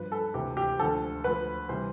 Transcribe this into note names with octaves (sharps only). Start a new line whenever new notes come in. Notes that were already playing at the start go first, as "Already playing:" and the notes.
Already playing: G2 F3 B4
A4
D2 C3 E3 G4
G4
D2 D3 F3 A4
D2 D3 F3 B4
C3 E3 G3 C5